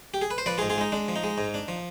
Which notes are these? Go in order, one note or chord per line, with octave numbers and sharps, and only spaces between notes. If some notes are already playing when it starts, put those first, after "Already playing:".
G4
G#4
B4
C5
F3 B4 D5
F4 G#4
G#2
F4 G#4
G#3 D#4
G#3 D4
F3
D#4
G#3
G#2
D4
F3